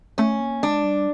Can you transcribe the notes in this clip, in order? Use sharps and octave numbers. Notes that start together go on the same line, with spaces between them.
A3 C#4
A#3
G#3 D4
G3